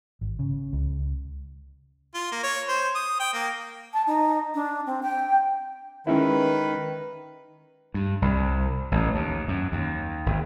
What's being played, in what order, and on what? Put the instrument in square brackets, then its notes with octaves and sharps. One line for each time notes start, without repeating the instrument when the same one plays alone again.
[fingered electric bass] G#1
C#3
C#2
[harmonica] F4
A#3
C#5
C5
D#6
G5
A#3
[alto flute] A5
D#4
D4
C4
G5
[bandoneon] D#3 [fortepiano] G#3 C#4 E4 [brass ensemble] B4
[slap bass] G2
C2
A1
D#2
F#2
D#2
G#1